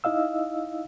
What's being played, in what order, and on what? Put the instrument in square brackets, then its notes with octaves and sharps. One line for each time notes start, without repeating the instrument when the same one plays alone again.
[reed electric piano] D#4 E4 D#5 F5 E6